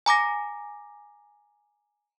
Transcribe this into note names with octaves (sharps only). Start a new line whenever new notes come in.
G#5 A#5 D6 A#6